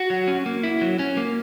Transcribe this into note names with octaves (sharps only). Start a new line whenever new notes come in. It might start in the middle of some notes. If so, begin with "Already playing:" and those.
Already playing: F#4
F#3
C#4
A#3
E4
F#3
C#4
A#3